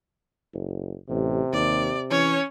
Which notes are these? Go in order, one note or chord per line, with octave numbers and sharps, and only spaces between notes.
F#1
A1 C3
D#2 D5
E3 C#4 C#5